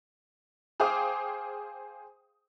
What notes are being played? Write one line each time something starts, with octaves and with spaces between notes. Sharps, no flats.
G#4 C5 F5 G5 D6 D#6